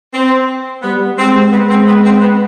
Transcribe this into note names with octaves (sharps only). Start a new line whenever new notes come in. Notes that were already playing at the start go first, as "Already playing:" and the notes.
C4
G3 B3
G#3 C4
G#3 B3
C4
B3
C4
B3